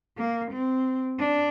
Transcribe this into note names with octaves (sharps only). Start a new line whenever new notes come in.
A#3
C4
D4